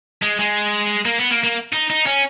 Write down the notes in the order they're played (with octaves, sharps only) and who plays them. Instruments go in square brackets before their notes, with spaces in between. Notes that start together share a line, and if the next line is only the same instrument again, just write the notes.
[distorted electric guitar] G#3
G#3
A#3
B3
A#3
A#3
D#4
D#4
C#4